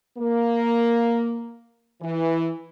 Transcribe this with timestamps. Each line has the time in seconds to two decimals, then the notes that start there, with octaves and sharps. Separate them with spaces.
0.18 A#3
2.02 E3